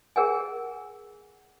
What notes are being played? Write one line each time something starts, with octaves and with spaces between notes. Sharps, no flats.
G#4 A#4 F#5 G#5